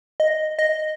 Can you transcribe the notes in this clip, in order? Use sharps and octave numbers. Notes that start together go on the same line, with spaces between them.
D#5
D#5